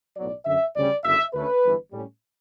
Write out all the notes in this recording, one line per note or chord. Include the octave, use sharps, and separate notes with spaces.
B1 A2 F#3 B3 D5
F#2 D3 F#3 E5
D2 C#3 G3 C#4 D5
F#1 F#2 D3 E5
D2 D3 A3 C#4 B4
G1 G2 E3
A2 G3 C#4